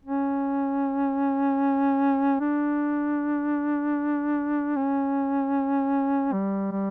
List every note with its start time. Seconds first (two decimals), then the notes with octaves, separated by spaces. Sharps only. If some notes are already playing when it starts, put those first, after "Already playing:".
0.05 C#4
2.40 D4
4.76 C#4
6.32 G3
6.72 G3